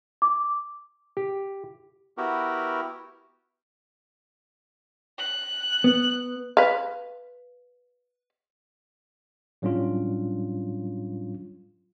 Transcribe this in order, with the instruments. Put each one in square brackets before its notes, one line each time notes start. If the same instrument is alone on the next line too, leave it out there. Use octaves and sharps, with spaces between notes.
[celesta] D6
[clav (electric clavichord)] G4
[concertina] B3 E4 F#4 G4 A#4
[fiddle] F#6
[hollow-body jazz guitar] B3
[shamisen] B4 F5
[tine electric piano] A2 F#3 G3 C#4 D4 F4